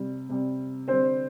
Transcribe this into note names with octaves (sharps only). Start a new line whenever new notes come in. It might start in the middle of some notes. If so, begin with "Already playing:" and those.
Already playing: C3 G3
C3 G3
D3 G3 C4 C5